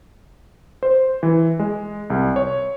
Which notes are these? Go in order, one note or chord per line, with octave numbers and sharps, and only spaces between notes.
C5
E3
G#3
C2
C#5